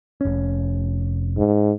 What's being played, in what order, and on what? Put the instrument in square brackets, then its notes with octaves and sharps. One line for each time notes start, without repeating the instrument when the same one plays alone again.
[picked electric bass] F1 C#4
[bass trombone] G#2